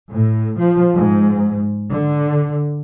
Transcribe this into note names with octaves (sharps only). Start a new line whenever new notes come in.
A2
F3
G#2
D3